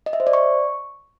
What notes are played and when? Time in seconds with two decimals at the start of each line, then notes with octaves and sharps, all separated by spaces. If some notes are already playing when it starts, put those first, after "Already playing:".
0.06 D#5
0.13 E5
0.20 C5
0.27 D5
0.33 C#6